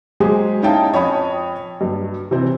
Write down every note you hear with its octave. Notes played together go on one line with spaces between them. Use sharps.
F#3 G#3 G4 G#4 C5
C#4 D#4 E4 F5 G5 A5
F2 C#5 G5 G#5 B5 D#6
G2 F#3
C3 E3 C4